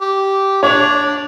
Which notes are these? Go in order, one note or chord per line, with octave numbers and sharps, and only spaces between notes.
G4
D4 C#5 F7